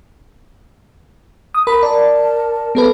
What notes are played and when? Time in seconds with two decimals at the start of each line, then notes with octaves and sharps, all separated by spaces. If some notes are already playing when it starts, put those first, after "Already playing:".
1.54 D#6
1.67 A#4 B5
1.83 A#4 D5 A5
2.75 B3 A4 B4